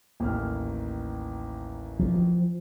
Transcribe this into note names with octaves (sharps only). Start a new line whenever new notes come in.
A1 D#2 F6
F3